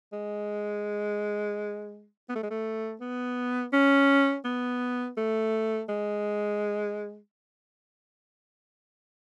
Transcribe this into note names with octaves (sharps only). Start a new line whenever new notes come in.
G#3
B3
A3
G#3
A3
B3
C#4
B3
A3
G#3